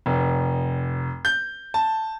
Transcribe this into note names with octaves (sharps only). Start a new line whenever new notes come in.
F1
G6
A5